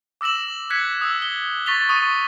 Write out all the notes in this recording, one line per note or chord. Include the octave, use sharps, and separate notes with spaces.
D6 E6 A#6 E7 F#7
F#6 G#6 B6 C#7
D#6 E6
G7
C#6 A6 B6 F7 G7
C#6 D#6 A6 D#7